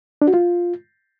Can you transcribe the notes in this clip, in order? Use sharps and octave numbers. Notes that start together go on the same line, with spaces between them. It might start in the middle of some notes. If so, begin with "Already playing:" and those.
D4
F#4
F4